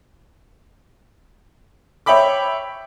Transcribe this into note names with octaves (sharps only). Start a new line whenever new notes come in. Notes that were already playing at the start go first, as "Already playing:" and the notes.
C#5 E5 G5 B5 D6